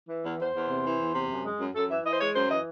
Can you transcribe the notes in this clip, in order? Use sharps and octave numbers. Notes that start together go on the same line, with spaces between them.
E3
E2
E2 C5
E2
C3
E3
E2
C3
F#2
G#3
F#2
F#2 A4
E3 E5
E3 D#5
C5
G#3 C#5
F#2 C5
E3 D#5